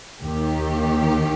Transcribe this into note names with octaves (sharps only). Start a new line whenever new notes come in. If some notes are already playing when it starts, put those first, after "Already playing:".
D#2 D#3 G4